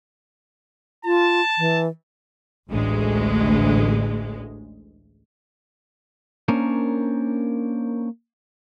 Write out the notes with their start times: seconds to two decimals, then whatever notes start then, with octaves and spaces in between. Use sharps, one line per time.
1.05 F4 A5
1.58 E3
2.71 A1 D2 G#3
6.48 A#3 C#4 D4 A#4 C5 C#5